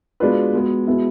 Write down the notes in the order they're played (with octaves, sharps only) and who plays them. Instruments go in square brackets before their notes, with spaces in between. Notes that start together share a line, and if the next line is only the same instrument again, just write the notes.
[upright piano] B2 G#3 D4 F4 B4
B2 G#3 B3
B2 G#3 B3 E4